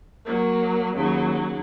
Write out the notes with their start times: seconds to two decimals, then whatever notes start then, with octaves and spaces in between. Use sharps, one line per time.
0.25 F#3 A#3
0.94 D#2 C#3 F#3